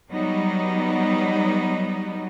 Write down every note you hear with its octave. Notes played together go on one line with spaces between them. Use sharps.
F#3 G3 B3 D#4